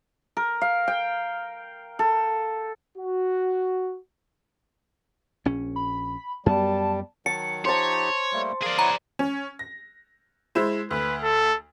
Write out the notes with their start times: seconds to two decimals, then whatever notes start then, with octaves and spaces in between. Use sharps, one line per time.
0.37 A#4
0.61 F5
0.88 G5
1.99 A4
2.97 F#4
5.45 A#1 C#4
5.76 B5
6.46 F#2 G3 B3 A5
7.26 D#3 F#3 A5 C#7
7.65 F3 D#4 G4 C5 C#5 A5
8.33 G3 A3 A#3
8.63 G#4 A#4 D5 F5
8.79 E4 C#5 F#5 A#5
9.19 C#4
9.59 A#6
10.55 G#3 E4 C5
10.91 D2 B4
11.23 A4